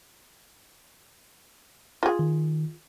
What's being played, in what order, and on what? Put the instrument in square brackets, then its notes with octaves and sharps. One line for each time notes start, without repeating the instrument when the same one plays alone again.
[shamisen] F4 G#4
[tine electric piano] D#3